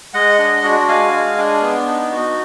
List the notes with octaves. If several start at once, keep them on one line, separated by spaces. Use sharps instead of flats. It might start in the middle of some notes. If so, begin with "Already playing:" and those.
G#3 D#5 F#5
D4
F#4
G#3 F5 G#5
G#3
D4
B3
D#4
F#4